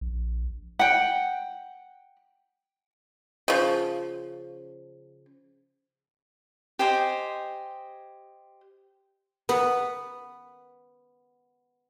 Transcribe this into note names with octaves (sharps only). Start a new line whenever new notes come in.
A#1
F#5 G5
C#3 F3
G4 C5 D#5 G#5
B3 B4